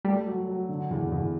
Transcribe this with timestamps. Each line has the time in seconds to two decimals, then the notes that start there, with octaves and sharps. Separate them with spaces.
0.05 G3 A3
0.26 F#3
0.47 F#3
0.69 D3
0.91 E2
1.12 E2